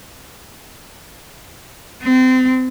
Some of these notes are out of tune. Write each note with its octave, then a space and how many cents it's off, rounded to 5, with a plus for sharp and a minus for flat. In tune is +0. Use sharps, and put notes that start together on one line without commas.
C4 -30